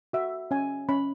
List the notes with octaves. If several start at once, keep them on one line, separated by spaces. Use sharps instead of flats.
F#4 E5
C#4 G#5
C#4 B5